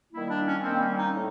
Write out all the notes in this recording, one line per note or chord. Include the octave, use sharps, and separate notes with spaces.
D#3 G3 A#3 E4
D4
C#4
D#3 G3 A#3 C4
C#4
D#4
A2